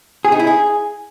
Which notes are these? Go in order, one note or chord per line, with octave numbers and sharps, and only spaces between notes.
G#4
D#4
E4
G#4